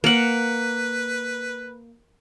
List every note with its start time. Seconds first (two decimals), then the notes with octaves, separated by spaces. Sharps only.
0.04 A#3 B4 F#5